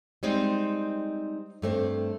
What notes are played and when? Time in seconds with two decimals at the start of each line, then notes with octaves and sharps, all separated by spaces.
0.23 G3 G#3 C4 D#4
1.62 G2 A3 C4